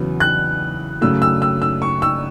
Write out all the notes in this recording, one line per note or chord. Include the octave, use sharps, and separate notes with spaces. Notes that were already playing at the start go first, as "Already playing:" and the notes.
Already playing: E2 C#3 F#3 B3
F#6
F#2 C#3 F#3 A3 E6
E6
E6
E6
C#6
E6